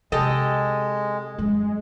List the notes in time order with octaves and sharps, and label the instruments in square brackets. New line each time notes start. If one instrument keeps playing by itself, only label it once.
[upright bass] C3 [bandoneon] G#3 [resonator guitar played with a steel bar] G4 A4 D#5
[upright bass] F#2 G3 [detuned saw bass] G#3